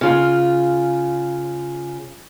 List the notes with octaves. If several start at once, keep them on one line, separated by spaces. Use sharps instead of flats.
C#3 F4